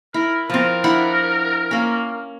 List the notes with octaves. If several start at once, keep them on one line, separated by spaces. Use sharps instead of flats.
E4 A#4
F3 C4 A#4
D4 E4 F#5
A#3 C#4